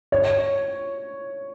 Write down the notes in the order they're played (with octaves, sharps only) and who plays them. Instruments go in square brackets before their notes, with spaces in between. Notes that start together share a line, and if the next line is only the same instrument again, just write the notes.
[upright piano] C#5